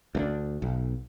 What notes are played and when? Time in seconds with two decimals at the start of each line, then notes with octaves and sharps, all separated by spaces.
0.15 D2 A3 D4
0.62 B1